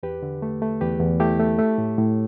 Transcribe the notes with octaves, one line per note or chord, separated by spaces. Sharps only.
E2 G4 B4
D3
A3
A3
E2 G4 B4
E2
A3 E4 G4
A3
A3
A2
A2